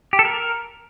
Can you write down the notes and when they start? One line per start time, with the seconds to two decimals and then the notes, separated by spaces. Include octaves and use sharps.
0.13 G4
0.19 A4
0.25 A#4